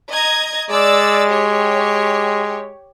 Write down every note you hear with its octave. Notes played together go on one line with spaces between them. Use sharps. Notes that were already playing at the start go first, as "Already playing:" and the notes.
D#5 A#5 G#6
G#3 D5 E6 A6
G4 C#5